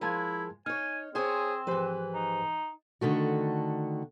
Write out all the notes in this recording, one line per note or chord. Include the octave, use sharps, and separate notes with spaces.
F3 G#3 E4 A#4 A5 G#6
D#4 C#5 G#5 F6
C4 G#4 C5 C#5 G#5
G#2 E3 F3 G4 B4 C5
D#4
D3 D#3 A3 F#4